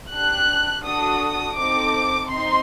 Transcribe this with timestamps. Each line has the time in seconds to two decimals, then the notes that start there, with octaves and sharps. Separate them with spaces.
0.13 D4 G4 F#6
0.85 D4 F#4 A4 D#6
1.58 C4 D#4 A4 D6
2.30 C4 D#4 C6